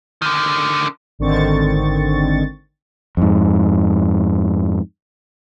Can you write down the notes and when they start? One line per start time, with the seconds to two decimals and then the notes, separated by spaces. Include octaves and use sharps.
0.22 D3 D#3
1.19 G#1 D3 D#3 C4 C#6 A6
3.17 F2 G#2